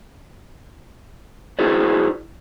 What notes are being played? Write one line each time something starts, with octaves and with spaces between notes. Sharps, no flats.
E4 F#4 G#4 B4 C5 D5